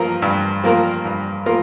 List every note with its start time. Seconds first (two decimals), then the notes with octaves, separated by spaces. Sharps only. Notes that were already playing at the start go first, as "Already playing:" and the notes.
Already playing: G2 F3 A#3 F4 A#4
0.22 G2
0.64 F3 A#3 F4 A#4
1.05 G2
1.46 F3 A#3 F4 A#4